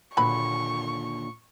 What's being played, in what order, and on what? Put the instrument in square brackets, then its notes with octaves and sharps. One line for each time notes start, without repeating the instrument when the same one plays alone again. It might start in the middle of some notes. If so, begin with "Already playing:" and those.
[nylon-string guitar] D#2 A#2 D3 [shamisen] F#3 B4 B5 [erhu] C#6